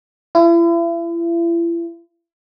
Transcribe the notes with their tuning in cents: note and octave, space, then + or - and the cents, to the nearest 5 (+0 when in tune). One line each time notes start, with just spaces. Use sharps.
E4 +40